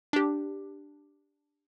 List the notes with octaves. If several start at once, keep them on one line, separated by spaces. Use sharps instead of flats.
D4 G4